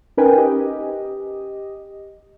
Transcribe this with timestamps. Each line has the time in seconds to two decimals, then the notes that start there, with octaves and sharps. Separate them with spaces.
0.17 C#4 D#4 A#4 B4 G5 G#5
0.38 G4 D#5